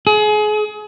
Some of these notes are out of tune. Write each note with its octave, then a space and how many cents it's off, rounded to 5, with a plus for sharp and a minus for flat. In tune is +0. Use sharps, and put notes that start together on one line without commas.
G#4 +30